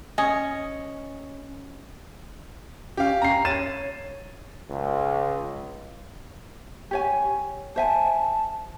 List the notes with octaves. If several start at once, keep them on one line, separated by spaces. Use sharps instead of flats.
C#4 D#5 G#5 D#6
C#4 G4 F5
C#4 A#5 C7
C#5 A6 D#7 E7
C#2
G4 C#5 G#5
C5 E5 G#5 A5